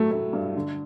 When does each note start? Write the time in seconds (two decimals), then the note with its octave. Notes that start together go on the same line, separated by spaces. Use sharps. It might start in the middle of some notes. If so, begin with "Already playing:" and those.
Already playing: A2 F#3 A3
0.11 A3
0.33 G2
0.56 D3